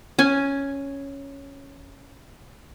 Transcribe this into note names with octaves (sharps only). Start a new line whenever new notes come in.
C#4 G#5